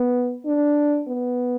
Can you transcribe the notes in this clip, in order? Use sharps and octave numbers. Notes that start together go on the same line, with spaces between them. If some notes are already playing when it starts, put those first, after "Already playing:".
Already playing: B3
D4
B3